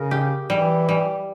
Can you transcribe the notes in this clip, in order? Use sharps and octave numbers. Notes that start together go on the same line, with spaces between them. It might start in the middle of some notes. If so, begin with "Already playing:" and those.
Already playing: C#3 A#4
G4
E3 G3
G3